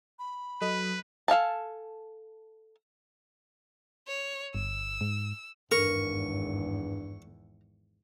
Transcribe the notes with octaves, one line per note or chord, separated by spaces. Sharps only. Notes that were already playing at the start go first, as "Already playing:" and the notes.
B5
F#3 A4 B4 D#5
A4 F5 G#5 A5
C#5
G1 E6
G#2
G#1 E2 G2 A#4 C#6